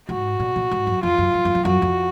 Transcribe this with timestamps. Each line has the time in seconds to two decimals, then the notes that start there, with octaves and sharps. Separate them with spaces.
0.09 G#2 F#4
0.40 A#2
0.56 A#2
0.71 G#2
0.87 F#2
1.03 F2 F4
1.18 F#2
1.34 F#2
1.45 F#2
1.55 F2
1.65 F#2 F#4
1.82 F2